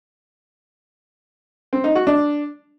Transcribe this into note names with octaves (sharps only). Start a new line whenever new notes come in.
C4
D#4
F#4
D4